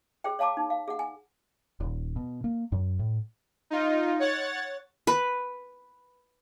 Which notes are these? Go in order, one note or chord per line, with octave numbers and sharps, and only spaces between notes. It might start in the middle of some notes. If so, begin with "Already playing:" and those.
G#4 C5 G5
C#5 F5 A5 A#5 D6
D#4
F5
G#4 F#5
G#5
D#1
B2
A#3
F#2
A2
D#4 F4
C#5 F#5 A6
B4